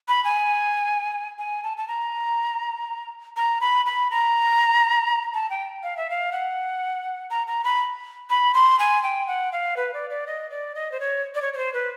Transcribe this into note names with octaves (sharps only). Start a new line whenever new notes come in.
B5
G#5
G#5
A5
A5
A#5
A#5
B5
B5
A#5
A5
G5
F5
E5
F5
F#5
A#5
A#5
B5
B5
C6
G#5
G5
F#5
F5
B4
D5
D5
D#5
D5
D#5
C5
C#5
D5
C#5
C#5
C5
B4